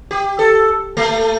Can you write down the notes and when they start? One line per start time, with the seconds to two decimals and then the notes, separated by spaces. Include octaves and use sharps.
0.11 G4
0.39 A4
0.97 A3